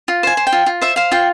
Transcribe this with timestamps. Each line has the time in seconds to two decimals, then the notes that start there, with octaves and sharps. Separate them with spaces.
0.08 F4
0.23 C5 G#5
0.37 C5
0.47 G5
0.52 F4
0.66 F4
0.81 C5 E5
0.96 C5 F5
1.12 F4 G5